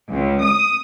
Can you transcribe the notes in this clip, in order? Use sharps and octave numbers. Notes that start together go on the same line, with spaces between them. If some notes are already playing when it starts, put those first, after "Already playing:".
C#2
D#6